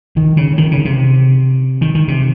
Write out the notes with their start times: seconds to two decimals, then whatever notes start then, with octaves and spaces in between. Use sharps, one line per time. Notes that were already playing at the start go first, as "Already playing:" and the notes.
0.17 D#3
0.37 C#3
0.58 D#3
0.71 C#3
0.85 C3
1.81 D#3
1.95 D#3
2.08 C3